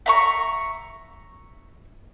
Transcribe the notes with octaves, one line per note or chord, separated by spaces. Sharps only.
E5 A#5 C#6